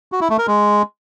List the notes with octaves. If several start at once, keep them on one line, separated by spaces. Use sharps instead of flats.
F#4
E4
A3
A#4
G#3